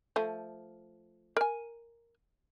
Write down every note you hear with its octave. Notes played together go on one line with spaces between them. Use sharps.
F3 A3
A#4 G#5